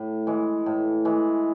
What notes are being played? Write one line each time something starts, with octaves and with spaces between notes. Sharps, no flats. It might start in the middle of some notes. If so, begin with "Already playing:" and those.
Already playing: A2
E3 G#3
A2
E3 G#3